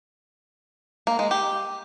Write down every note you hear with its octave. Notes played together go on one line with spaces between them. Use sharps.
A#3
G#3
G4